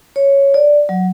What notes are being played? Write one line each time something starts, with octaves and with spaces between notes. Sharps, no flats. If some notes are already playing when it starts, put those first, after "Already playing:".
C#5
D5
F#3